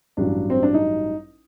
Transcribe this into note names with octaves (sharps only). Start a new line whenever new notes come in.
A1 G2 F#3 D4
C4
D4
D#4